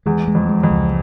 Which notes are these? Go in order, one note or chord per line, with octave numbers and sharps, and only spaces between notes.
E2 G#3
G#3
F2
G#3
F2
C#2